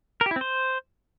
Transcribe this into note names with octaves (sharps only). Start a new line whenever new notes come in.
A#4
G4
E4
C4
C5